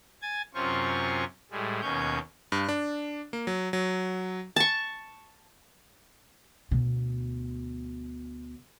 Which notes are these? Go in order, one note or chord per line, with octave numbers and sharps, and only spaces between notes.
G#5 G#6 A6
F#2 C3 C#4 F4 C5 C#6
A2 G3 G#3
D#2 B2 C#4 C#5 G6
G2
D4
A#3
F#3
F#3
A5 C#6
D2 B2